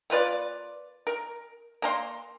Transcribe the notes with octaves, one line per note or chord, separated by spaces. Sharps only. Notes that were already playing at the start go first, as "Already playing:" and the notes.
A#3 F4 B4 D5
A#4
A#3 A#5 C6